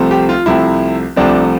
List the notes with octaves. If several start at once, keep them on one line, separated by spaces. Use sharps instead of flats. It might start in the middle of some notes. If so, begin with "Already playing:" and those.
Already playing: C2 C3 F3 A3 C4
G4
F4
C2 C3 F3 A3 C4 E4
C2 C3 F3 A3 C4 D4